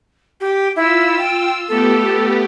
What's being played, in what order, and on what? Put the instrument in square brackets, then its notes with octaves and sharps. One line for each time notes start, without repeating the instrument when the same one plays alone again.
[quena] G4
[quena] E4 [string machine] F4 E6
[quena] G5
[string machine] A3 B3 G4 [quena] A4